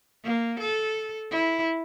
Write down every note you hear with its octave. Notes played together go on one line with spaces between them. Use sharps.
A#3
A4
E4